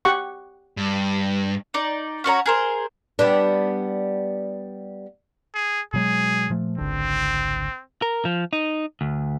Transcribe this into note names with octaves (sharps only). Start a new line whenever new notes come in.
G4 F#5 C#6
G2
D#4 D5
C#4 F#4 C#5 A#5
G#4 A#4 C5
G3 B3 D4
G#4
B2 F#3 G#3 G#4
A#2 F3 A3
G#1 C#2 D3 C4
A#4
F3
D#4
D2